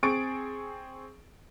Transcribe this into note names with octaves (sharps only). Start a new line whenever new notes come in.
C4 G#4 C#6 A6 D7